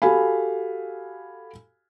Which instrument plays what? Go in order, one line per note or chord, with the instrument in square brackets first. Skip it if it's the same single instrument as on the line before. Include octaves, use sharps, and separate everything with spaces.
[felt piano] F#4 G4 A4 F5 G#5 B5